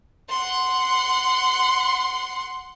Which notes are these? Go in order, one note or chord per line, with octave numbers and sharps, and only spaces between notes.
F#5 C6